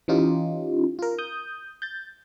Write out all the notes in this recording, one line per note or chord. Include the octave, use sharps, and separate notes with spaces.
E3 C#4 D#4 F4 G4
F4 A#4
D#6 G6
G6 A6